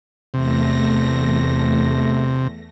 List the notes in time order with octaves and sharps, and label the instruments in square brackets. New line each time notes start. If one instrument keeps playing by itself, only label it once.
[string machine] E2 A3 A#6 [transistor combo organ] C3